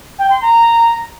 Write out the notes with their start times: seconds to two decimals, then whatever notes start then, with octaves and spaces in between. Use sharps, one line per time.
0.18 G5
0.30 C6
0.41 A#5